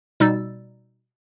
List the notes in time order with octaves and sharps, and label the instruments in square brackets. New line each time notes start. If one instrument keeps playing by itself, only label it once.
[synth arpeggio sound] B2 G3 D#4 E6 A6